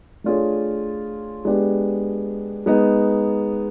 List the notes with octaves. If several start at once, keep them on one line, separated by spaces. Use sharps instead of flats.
A3 D4 F4 G#4 C#5
G#3 B3 D4 G4
G#3 B3 D#4